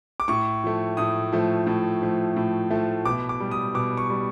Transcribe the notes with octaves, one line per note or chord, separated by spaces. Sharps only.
D6
A2 C#6
F3 A3
A2 D#6
F3 A3
A2
F3 A3
A2
F3 A3
B2 D6
D6
G3
D#6
B2 D6
C#6
G3